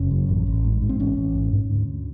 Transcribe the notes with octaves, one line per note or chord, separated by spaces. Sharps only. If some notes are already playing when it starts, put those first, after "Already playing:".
Already playing: F#1 C#4
F#2
A1
A1
G#2
G#2
C4
A1 C#4
A1
G#2
G#2
D2
D2